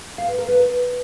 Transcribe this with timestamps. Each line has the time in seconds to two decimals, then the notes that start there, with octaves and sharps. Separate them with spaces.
0.18 F5
0.28 B4
0.38 A#4
0.48 B4